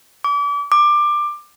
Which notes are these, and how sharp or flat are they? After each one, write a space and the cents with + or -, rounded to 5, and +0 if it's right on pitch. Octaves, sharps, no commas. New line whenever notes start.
D6 -35
D6 +20